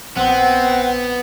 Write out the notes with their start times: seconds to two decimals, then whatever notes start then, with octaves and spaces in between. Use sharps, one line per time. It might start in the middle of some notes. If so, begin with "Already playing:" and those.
0.17 A#1 B3 C4 F#5